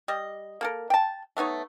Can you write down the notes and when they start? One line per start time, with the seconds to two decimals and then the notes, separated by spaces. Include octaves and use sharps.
0.08 G3 D#5
0.61 A#3 A4 A#4
0.90 G5 A5
1.37 A3 B3 D#4 C#5